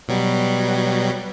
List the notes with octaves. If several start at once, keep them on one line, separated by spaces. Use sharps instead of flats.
B2 F#3 G3